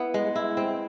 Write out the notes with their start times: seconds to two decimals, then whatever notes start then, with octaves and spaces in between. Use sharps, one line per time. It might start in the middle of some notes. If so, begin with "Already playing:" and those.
Already playing: B3 E4
0.14 G#3
0.36 E4
0.57 C4